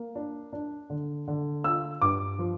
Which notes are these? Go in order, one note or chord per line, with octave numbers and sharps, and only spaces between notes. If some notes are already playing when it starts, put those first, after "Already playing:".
Already playing: A#3
D4
D4
D3
D3
F4 E6
G2 D6
F3